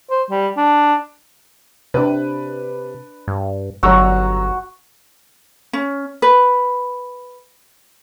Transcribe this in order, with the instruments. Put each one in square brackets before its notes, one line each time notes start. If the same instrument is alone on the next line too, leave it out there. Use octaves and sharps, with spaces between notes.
[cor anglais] C5
G3
D4
[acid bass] C3 [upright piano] D4 B4
[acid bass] G2
[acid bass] G1 [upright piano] F#3 A#5 E6 [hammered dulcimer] F#4
[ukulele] C#4
B4